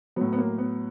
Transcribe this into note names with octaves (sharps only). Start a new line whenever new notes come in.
A2 F#3 B3
B3
A#3
B3